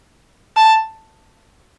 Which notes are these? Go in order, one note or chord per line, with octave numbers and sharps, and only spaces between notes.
A5